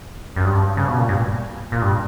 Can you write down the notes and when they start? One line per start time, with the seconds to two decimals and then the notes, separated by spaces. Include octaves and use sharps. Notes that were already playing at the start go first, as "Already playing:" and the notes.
0.36 F#2
0.45 G2
0.77 C#3
0.88 B2
0.98 A#2
1.09 G2
1.72 A#2
1.82 G2